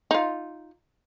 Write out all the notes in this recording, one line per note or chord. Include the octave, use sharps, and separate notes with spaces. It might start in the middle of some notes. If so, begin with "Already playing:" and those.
D#4 F4